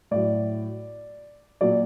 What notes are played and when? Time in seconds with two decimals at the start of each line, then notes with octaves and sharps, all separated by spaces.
0.11 A2 F#3 D5
1.61 A#2 F#3 D5